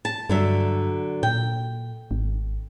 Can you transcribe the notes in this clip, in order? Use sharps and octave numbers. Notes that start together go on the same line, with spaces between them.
A5
G2 D3 F#3 E5
A#2 G5
G#1